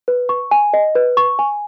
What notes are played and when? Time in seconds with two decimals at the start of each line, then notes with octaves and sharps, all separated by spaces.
0.08 B4
0.29 C#6
0.51 G#5
0.74 D#5
0.95 B4
1.17 C#6
1.39 G#5